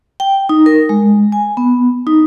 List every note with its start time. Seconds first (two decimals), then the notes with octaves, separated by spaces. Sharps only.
0.20 G5
0.49 D#4
0.66 A#4
0.89 G#3
1.32 G#5
1.57 B3
2.07 D#4